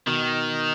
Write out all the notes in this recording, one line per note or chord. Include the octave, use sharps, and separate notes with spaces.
B2 D#3